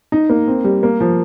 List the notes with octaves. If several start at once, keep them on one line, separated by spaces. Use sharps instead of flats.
D#4
A#3
C4
G3
A#3
F3